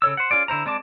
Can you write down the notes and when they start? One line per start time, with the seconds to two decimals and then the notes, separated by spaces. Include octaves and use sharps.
0.02 C#3 A4 C#5 E6
0.17 C5 F#5
0.31 C#4 F4 G#4 D5
0.48 D3 E4 C5 A#5
0.66 G#3 C4 D5 A5 D6